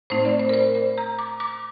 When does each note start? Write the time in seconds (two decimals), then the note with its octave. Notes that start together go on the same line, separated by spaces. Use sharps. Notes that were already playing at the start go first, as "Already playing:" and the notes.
0.10 A2 A3 C4 D#4 C5
0.25 D5
0.39 C5
0.49 A#4
0.54 C5
0.75 C5
0.98 A#5
1.19 D6
1.40 D6